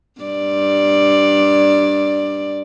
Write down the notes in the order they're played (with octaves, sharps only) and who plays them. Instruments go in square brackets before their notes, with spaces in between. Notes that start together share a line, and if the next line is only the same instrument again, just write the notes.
[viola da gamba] G2 D5